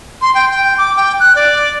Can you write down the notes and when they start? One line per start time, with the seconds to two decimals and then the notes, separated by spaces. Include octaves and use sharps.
0.22 C6
0.35 G5
0.51 G5
0.78 D6
0.96 G5
1.20 F#6
1.35 D5